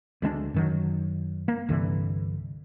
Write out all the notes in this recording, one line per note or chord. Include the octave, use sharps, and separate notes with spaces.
D2 G#3 A#3 D4
F#2 D#3 F#3
A#3
C2 G2 D3 E3